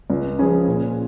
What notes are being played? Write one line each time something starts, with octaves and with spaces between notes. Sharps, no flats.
C#2
C#3 F3 C#4 G#4
A#2